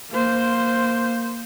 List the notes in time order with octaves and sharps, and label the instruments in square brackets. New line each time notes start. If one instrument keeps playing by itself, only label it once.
[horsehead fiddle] A#3 C5